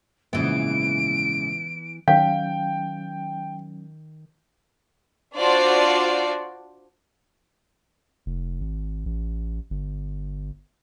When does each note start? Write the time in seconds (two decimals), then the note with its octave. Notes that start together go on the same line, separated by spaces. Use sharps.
0.33 A#1 G#2 C#3 E3 B3 D7
2.08 D#3 F#3 C#4 F5 G5 G6
5.36 D4 F4 F#4 C5 D5
8.26 F1
8.60 G#1
9.05 A1
9.70 G1